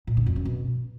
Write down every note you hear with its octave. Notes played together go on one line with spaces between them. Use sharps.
A#2
D3
F2
F#2
B2